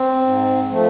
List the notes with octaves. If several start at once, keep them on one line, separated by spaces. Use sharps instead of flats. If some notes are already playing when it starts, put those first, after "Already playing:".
Already playing: C4
G#2
F3 A3